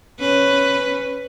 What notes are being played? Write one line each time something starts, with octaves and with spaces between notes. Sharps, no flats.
C#4 B4